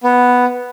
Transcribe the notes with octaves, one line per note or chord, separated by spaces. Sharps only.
B3